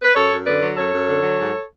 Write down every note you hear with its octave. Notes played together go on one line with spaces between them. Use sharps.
B4
F#2 A4 C#5
F#2
D3 B4 D5
F#3
F#2 A4 C#5
F#2
D3
F#3
G#2